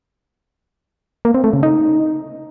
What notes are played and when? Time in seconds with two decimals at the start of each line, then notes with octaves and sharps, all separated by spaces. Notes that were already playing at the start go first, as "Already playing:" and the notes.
1.25 A#3
1.34 C4
1.44 A3
1.53 C#3
1.63 D#4